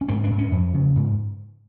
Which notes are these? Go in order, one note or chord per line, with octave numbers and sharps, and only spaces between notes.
C#4
G#2 C4
D4
G#2
C#4
F2
C#3
G#2